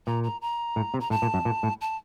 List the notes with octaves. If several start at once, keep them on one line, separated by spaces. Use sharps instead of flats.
A#2 A#5
A#5
A#5
A2
C3
A#5
A2 A5
A#2
F#2
A#2
A2
A5